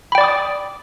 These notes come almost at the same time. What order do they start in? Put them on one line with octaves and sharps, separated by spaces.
B5 G5 D5 D6 D#6